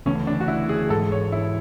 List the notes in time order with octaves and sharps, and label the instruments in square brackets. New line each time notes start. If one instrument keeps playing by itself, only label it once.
[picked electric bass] D2 C#3 E3 A3 [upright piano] C#4
[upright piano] D4
F#4
E4
G#4
[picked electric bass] G#2 E3 G#3 [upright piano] A4
[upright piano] C#5
E4